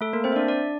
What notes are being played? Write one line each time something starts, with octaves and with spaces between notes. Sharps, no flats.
A3 A4
A#3 A#4
C4 C5
E5
D4 D5
D4 D5